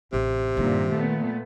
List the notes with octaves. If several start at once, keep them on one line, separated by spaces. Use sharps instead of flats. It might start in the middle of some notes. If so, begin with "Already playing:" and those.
A1 C3
G2 A#2 D#3 C4
A#2 A3 B3